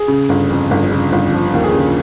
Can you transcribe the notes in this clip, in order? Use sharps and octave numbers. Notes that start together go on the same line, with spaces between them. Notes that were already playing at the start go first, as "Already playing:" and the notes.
Already playing: G#4
C#3
G1
F2
G1
C#3
G1
F3
D#2
G#4
C#3